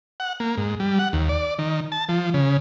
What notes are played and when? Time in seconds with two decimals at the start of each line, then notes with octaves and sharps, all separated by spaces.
0.20 F#5
0.40 A#3
0.57 G#2
0.80 G3
0.99 F#5
1.13 D#2
1.29 D5
1.59 D#3
1.92 A5
2.09 F3
2.34 C#3